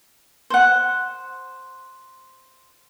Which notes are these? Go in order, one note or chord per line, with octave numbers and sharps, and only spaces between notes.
C5 F#5